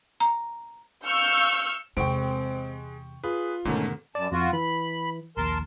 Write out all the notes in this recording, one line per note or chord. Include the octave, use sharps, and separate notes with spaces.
A#5
F5 C#6 E6 F6 G6
E2 C3 G#3 C4 G5 C#6 D7
F4 G#4 B4
E1 G#2 D3 D#3 A3 C#4 A#4
F#2 D5 A5
F2 F4 F#4
E3 B5
A#1 D#2 A#4 A5 C6